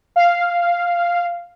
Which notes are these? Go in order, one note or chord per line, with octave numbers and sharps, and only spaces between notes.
F5